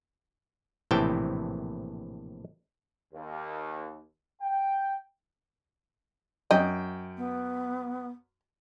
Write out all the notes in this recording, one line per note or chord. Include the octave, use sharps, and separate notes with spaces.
A#1 A2 C3 E3 G5 A5
D#2
G5
F#2 D#5 G5
B3